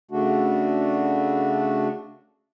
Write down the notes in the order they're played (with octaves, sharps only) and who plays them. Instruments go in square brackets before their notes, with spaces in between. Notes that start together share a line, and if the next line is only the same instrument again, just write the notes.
[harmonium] C#3 A3 D4 F#4